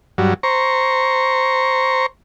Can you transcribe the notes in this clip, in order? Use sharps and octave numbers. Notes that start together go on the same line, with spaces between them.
G2 F#3
C5 A#5 C#6